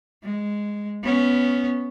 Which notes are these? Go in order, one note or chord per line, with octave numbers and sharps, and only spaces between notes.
G#3
B3 C#4